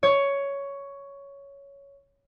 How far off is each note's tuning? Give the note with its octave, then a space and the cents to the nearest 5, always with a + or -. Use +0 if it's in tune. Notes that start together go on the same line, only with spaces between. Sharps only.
C#5 +10